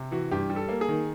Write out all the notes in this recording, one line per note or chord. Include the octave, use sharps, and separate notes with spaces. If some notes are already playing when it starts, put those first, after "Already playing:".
Already playing: C3
E3 F#4
G2 G4
G3
A4
A#3
G#4
D#3